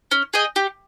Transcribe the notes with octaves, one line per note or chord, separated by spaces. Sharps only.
C#4
G#4 D#5 G5
G4